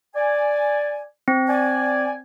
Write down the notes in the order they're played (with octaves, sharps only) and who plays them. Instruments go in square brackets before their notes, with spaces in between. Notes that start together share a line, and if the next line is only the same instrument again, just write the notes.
[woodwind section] D5 G#5
[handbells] C4
[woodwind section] D5 G#5